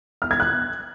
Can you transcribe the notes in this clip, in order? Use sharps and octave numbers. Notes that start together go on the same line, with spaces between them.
F6
G#6
F#6